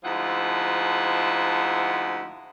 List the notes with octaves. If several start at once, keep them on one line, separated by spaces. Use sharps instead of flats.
D2 G#2 F3 E4 F#5